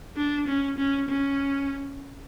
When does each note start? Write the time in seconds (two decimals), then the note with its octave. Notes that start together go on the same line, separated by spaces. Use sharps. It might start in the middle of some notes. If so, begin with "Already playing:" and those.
0.17 D4
0.47 C#4
0.78 C#4
1.08 C#4